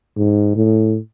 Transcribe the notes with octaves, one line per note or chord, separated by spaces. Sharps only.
G#2
A2